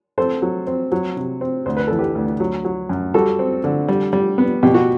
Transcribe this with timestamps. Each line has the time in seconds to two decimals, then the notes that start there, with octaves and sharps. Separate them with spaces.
0.18 C4 A4 C5
0.42 F#3
0.67 C4
0.92 F#3
1.17 C3
1.41 C4
1.66 D2 C5
1.77 B4
1.87 E3 A4
1.99 G4 B4
2.15 D2
2.40 F#3
2.65 F#3
2.89 F#2
3.14 G3 F#4 A4
3.39 C4
3.64 D3
3.88 G3
4.13 G3
4.38 B3
4.63 B2 G4
4.74 F#4